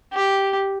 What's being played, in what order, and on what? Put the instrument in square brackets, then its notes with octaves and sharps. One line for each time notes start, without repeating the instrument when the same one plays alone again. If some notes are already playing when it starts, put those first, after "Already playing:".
[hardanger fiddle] G4